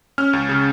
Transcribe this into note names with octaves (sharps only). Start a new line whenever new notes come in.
C#4 F6
C#2
C#3